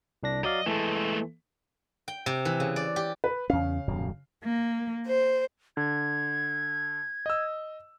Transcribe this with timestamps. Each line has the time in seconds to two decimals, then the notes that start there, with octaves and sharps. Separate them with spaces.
0.23 C2 D4 A#6
0.44 F#3 D5 D#5 F5
0.66 E3 G#3 A3 A4
2.08 G5
2.26 C3
2.45 E3
2.60 C#3
2.76 D5
2.96 G4
3.24 B4
3.50 E2 C#3 C#4 F5
3.88 D#1 F#2 B2
4.44 A#3
5.06 C5
5.77 D3 G#6
7.26 D#5 E6